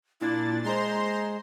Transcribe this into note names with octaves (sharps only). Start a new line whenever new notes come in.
A#2 D4 E4 A6
G#3 C5 A#5 C6